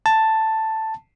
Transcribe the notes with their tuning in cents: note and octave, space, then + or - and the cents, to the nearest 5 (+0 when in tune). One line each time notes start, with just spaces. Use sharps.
A5 +5